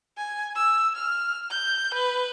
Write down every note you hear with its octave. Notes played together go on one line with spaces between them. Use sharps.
G#5
E6
F6
G6
B4